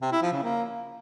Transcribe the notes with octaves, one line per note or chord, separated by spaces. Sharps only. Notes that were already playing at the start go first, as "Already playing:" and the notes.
C3
E4
F3
C#3
A#3